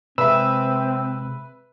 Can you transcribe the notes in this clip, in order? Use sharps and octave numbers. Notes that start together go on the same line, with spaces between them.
C3 G#3 C4 B4 E5 E6